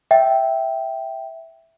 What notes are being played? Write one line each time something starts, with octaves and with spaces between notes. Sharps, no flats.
E5 G5